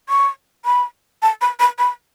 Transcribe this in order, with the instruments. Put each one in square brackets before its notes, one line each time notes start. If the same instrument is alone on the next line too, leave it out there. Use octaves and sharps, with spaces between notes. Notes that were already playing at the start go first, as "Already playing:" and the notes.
[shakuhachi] C#6
B5
A5
B5
B5
B5